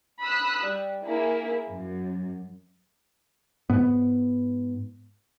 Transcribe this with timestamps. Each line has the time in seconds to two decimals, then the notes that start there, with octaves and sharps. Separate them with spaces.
0.22 B5 D#6 E6 F#6
0.63 G3
1.03 A#3 E4 G#4
1.68 F#2
3.70 G#2 B3